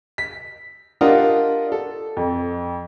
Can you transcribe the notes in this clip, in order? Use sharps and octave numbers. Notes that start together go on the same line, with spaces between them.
B6
D4 F4 G4 A#4 D#5 F#5
A4
F2